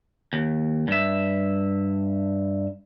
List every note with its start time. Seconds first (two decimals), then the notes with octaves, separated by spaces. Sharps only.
0.33 D#2
0.88 G2 E5